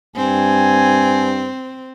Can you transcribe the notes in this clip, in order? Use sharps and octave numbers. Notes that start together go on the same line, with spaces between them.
G2 C4 G#5